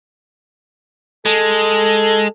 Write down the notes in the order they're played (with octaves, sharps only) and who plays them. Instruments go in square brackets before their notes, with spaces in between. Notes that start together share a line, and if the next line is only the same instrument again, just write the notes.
[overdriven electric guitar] G#3 [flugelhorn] A4